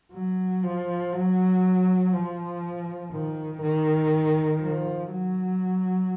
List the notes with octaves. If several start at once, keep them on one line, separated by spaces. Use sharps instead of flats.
F#3
F3
F#3
F3
D#3
D#3
F3
F#3